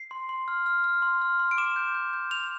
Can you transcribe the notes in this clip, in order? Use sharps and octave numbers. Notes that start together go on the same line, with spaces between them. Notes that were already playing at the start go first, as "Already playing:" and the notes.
Already playing: C7
C6
C6
F6
F6
F6
C6
F6
C6
D7
D6 E7
G6
G6
G6
G6 F7